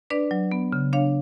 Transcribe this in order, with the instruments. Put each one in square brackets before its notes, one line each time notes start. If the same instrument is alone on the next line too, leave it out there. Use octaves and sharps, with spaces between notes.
[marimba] D4 B4 D5
F#3
B3
C#3
D4 C#5 F5